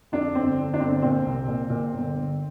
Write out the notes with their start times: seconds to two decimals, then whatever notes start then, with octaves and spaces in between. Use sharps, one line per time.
0.12 F2 D4
0.35 G1 C4
0.58 D3
0.74 D4
0.80 G1 C4
1.02 A#2 C4
1.26 C2
1.48 A#2
1.70 A#2
1.93 G1
2.15 G1